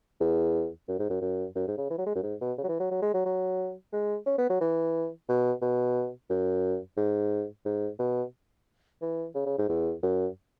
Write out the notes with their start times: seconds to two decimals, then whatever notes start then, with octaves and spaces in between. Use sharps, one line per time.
0.20 E2
0.88 F#2
0.99 G#2
1.10 F#2
1.21 F#2
1.56 F#2
1.68 G#2
1.78 C#3
1.90 E3
1.98 F#3
2.06 G#3
2.15 F#2
2.23 G#2
2.41 B2
2.58 C#3
2.63 F#3
2.68 E3
2.80 F#3
2.91 F#3
3.02 G#3
3.14 F#3
3.25 F#3
3.93 G#3
4.26 C#4
4.38 B3
4.50 F#3
4.61 E3
5.29 B2
5.62 B2
6.30 F#2
6.97 G#2
7.65 G#2
7.99 B2
9.02 E3
9.35 C#3
9.46 C#3
9.58 G#2
9.69 E2
10.03 F#2